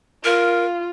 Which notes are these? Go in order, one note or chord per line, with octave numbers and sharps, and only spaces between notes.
F4 A#4